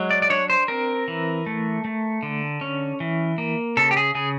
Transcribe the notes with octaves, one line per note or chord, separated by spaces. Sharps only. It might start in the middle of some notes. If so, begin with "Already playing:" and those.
Already playing: F#3 G#3
D5
D5
D4 C#5
C5
C4 A#4
E3
A3
A3
D3
C#4
E3
A#3
C#3 A4
G4
G#4
C#3 G#4